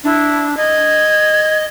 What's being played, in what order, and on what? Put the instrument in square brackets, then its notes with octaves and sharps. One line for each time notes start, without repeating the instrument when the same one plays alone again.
[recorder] D4 [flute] E4
[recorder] D#5 [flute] G#6